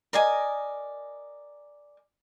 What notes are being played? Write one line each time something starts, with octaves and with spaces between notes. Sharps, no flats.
A#4 D5 D#5 G#5